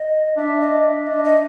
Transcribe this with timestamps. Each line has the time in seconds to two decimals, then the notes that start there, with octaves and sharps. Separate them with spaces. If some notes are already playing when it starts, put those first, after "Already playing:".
Already playing: D#5
0.37 D4 E5
0.61 D#5
0.84 E5
1.07 D4 D#5
1.24 D#5